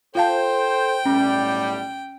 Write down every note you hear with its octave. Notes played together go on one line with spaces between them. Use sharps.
F4 A4 C5 F5 G5 A5
B1 A2 G3 C#4